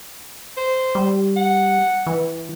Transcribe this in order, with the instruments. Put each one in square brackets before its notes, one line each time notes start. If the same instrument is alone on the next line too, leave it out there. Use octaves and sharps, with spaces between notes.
[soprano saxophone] C5
[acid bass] G3
[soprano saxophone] F#5
[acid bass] E3